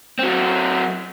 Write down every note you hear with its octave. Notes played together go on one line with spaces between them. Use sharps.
F#3 C4